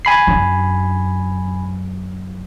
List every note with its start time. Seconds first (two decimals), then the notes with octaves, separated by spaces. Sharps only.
0.05 G#5 B5 C7
0.27 F#2 D4